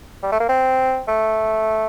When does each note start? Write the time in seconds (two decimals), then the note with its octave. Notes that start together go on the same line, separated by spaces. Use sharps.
0.23 G3
0.32 A3
0.40 A#3
0.49 C4
1.08 A3